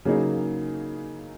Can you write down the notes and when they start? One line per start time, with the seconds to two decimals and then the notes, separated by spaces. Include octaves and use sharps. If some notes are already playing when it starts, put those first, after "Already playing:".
0.05 C#3 F#3 A#3 D#4 G#4